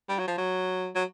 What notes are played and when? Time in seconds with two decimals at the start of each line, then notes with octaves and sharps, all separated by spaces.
0.09 G3
0.19 F#3
0.27 F3
0.38 F#3
0.95 F#3